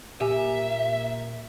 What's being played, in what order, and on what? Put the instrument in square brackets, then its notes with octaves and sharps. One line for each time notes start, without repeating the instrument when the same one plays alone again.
[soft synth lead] A#2 [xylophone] G4 G#5 [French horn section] A#4 [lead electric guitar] E5